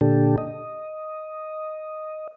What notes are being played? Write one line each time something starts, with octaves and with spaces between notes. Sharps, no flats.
A#2 D3 D4 G4 A4
D#5